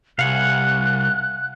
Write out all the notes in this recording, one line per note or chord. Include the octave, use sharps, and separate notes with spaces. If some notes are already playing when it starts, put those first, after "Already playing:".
C2 F5 F#5 G#5 F#6